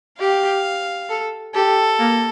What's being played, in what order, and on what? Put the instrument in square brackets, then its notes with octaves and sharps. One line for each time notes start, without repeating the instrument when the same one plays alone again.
[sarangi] G4 [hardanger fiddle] F5
[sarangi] A4
[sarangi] G4 [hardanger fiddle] A4
[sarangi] A#3